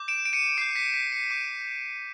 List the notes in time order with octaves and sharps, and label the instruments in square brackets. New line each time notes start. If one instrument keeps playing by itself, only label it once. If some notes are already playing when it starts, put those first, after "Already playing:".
Already playing: [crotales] D6 G6
D7 E7
D7
C#7 D#7
D6 G6 C7 D7
B6 C#7
B6 C#7
C#7 D#7
D6 G6 C#7 D#7